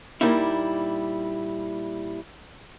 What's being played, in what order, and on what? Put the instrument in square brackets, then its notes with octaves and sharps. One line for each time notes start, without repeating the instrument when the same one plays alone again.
[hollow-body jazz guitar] A#2 F#3 G3 A#3 D#4 E4